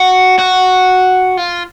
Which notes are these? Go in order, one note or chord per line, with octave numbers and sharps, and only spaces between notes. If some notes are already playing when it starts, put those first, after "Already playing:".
Already playing: F#4
F#4
F4